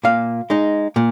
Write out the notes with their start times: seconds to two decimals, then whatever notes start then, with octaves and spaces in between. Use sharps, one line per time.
0.04 A#2 F5
0.50 G#3 D#4
0.96 A#2